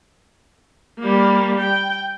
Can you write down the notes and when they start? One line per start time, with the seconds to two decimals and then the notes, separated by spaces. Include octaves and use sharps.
0.99 G3 A#3
1.60 G5